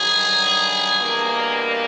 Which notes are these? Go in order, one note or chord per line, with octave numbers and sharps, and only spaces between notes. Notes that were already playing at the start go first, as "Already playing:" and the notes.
Already playing: G2 D#3 F#3 G#4
E2 B2 G3 A#3 D4